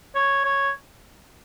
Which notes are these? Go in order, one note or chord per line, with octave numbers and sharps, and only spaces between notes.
C#5
C#5